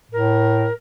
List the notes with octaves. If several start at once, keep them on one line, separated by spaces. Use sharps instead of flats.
A2 A#4